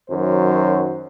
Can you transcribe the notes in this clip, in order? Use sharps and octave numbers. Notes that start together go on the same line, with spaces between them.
F#2 D#3 F#3 C5